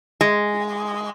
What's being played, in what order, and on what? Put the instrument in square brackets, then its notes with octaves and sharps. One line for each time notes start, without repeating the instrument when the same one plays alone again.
[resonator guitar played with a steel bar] G#3